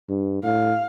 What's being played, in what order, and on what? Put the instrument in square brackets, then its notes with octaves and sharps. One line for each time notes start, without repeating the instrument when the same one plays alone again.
[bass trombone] G2
[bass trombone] A2 [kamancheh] F5